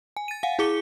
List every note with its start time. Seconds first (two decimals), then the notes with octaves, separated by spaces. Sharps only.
0.17 G#5
0.28 A6 D#7
0.43 F5 F#5 G#5
0.59 E4 G#4 D6 C#7 G7